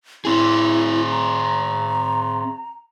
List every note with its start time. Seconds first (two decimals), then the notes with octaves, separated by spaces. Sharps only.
0.25 C4 E4 G#4
1.11 A#5